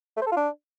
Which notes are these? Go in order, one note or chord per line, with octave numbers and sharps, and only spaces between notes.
A3
C5
A4
F4
D4